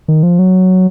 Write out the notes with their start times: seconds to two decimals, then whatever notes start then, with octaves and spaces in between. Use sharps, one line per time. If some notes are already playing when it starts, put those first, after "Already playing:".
0.08 D#3
0.23 F3
0.39 F#3